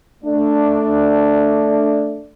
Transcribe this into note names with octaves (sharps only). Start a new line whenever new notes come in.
A3 D4